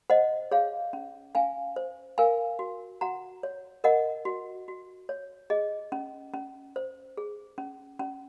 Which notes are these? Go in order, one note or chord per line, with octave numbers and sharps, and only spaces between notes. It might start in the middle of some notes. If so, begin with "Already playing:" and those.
C5 D#5 F#5
G#4 C#5 F5
C#4
C#4 F5 G#5
C5
A#4 F5 G#5
F#4
F#4 F#5 A#5
C#5
A#4 D#5 F#5
F#4
F#4
C#5
G#4 D#5
C#4
C#4
C5
G#4
C#4
C#4